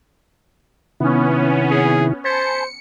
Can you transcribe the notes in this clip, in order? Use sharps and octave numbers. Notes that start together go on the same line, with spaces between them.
C3 D#3 B3 C#4 E4
G#4
C5 G#5 A5 B5 C#7